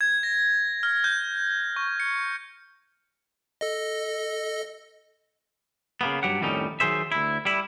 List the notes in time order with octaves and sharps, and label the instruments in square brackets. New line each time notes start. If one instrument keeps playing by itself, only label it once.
[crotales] G#6
A#6
F6
G6
C#6
C#7
[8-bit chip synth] A4 D#5
[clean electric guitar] C#3 A#3 B3
G2 F#3 G4 F#5
F2 A2 D#3 G3 C#4 D#4
D#3 F#3 G#4 C5 E5
D2 E4
G3 E4